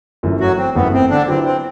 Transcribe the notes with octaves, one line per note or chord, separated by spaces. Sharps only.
G1 F#2 E3 A3
F#3 F#4
C4
G1 F#2 E3 A3 B3
C4
D3 D4
D3 F#3 B3 C4 E4
C4